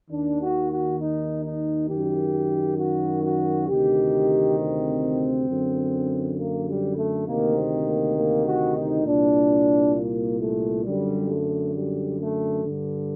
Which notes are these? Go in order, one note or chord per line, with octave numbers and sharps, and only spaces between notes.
D#2 D#3 D4
F#4
F#4
D#4
D#4
F#2 D#3 G4
F#4
F#4
D2 C3 D#3 G4
C4
F#2 D3
A#3
G3
A3
D2 C3 D#3 A#3
C4
A#3
A#3
F#4
D#4
C2 A#2 D4
A#3
A3
F#2 D3 G3
A3
G3
A3
G2 D3